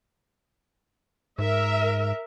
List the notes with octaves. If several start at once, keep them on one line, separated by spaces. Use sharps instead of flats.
G#2 A#4 E5